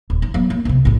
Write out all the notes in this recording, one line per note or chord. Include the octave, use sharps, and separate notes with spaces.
D#1
D#4
F#3 B3
A#3
C2 C3
A#1 A2